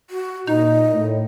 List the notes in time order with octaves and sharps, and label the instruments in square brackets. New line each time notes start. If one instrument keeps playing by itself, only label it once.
[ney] F#4
[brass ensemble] A#2 [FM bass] D#4 [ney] D#5
[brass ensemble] A2